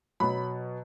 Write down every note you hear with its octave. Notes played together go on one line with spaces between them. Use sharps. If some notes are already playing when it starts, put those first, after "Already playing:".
B2 F#3 B5